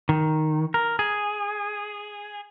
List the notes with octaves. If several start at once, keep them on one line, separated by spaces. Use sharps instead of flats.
D#3
A#4
G#4